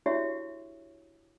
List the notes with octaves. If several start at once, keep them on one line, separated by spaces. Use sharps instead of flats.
D4 E4 F#4 G4 C#5 E5